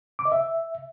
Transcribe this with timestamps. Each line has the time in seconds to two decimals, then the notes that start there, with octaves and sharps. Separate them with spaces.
0.19 D6
0.25 D#5
0.32 E5